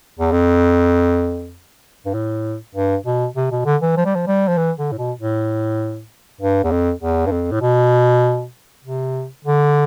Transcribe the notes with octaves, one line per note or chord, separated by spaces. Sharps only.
E2
F2
G2
A2
G2
B2
C3
B2
D3
E3
F3
G3
F3
G3
F3
E3
D3
A2
B2
A2
G2
E2
F2
E2
G2
F2
A2
B2
C3
D3